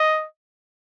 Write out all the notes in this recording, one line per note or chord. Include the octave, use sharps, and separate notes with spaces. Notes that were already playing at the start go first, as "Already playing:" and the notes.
Already playing: D#5